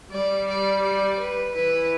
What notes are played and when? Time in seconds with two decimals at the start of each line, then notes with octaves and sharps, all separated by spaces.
0.11 G3 D5
0.48 D5
0.82 D5
1.19 B4
1.55 E3 E4 B4